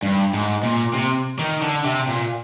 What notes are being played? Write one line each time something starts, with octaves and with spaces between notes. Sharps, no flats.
G2
G#2
A#2
C3
D#3
D3
C3
A#2